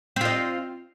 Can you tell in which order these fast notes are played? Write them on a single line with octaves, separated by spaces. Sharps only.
C4 F4 D#5